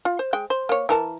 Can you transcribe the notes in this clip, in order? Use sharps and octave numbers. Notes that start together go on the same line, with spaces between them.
F4
C5
G#3 G5
C5
A#3 C#5
E3 A#4 A5